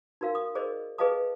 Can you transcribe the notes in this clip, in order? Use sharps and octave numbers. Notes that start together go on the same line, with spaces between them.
D#4 F#4 A#4 F5
D#6
G#4 A#4 C5 D5 D#5
G#4 B4 D#5 F5 A5 D#6